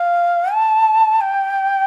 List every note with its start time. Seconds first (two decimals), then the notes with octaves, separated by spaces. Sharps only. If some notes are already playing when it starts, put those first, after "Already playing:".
Already playing: F5
0.53 A5
1.21 G5